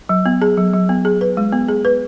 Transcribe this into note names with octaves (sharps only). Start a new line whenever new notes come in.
F#3
B3
G#4
F#3
F#3
B3
G#4
B4
G#3
B3
G#4
B4